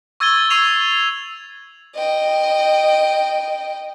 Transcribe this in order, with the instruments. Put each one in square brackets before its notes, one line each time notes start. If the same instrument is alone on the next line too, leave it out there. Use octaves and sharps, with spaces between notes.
[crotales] C#6 E6 G#6 A6 D#7 G7
C#6 E6 C7 D#7 F7 F#7
[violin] D#5 G5